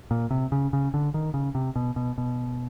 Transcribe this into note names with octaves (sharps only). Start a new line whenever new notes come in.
A#2
C3
C#3
C#3
D3
D#3
C#3
C3
B2
B2
B2